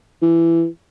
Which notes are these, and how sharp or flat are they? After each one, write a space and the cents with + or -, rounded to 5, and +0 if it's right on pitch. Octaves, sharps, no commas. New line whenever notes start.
E3 +15